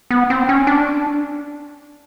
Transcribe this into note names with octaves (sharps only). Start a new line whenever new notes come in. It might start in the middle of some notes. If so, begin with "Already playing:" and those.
B3
C4
C#4
D4